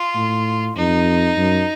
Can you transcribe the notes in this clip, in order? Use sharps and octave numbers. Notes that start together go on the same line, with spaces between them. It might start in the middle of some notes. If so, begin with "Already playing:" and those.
Already playing: F4
A2
F2 D#4
F#2